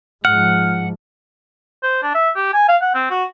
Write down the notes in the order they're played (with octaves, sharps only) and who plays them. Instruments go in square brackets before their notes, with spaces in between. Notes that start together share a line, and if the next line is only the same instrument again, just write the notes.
[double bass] G#2 F3 [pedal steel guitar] F#5 [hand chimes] F6
[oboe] C5
D4
E5
G4
G#5
F5
F#5
C4
F#4